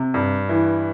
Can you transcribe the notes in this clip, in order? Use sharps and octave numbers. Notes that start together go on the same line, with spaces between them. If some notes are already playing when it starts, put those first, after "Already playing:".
Already playing: C3
G2
E3